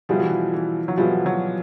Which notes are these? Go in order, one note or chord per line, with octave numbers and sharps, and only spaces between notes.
B2 F3 G3 B3 E4 G#4
E3
F3
E3
F#3
B2 F3 G3 B3 E4 G#4
F#3